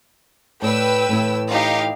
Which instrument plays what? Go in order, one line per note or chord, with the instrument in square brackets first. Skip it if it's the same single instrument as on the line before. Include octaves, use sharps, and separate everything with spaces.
[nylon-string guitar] A2 D5 [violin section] B4 G5 E6
[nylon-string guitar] A2 E3 E4
[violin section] D#4 G4 F5